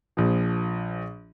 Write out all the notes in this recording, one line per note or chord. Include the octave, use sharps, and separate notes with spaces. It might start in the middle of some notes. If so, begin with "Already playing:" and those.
A#1 F3